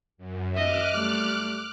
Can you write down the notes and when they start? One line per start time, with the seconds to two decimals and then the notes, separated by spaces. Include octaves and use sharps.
0.18 F#2
0.55 D#5 E5 D6 F6 F#6
0.94 G3 A3